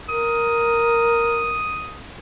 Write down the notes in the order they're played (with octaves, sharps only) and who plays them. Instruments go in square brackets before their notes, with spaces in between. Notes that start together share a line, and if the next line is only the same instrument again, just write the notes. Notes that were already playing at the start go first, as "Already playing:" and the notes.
[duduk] A#4 [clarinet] D#6